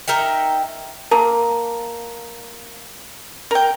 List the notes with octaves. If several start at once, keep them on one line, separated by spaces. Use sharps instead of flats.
D#4 A#4 E5 G5
A#3 A#4 A5 A#5
A#4 G5